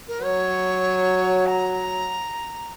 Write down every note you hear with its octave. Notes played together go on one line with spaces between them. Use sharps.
A#4
F#3 C#5
A#5